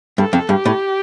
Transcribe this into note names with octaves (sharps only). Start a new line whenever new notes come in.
G2 A4
F2
G2 G4
A2